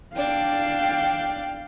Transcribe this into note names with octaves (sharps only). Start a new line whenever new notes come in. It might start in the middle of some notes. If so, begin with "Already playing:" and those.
D4 D5 F5 G5